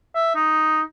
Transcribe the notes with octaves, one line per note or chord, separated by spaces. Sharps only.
E5
D#4